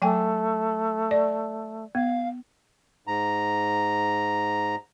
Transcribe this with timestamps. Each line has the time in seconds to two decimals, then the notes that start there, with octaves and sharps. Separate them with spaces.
0.02 F#3 A3 G5 G#5
1.11 D5
1.95 B3 F5
3.07 G#2 A#5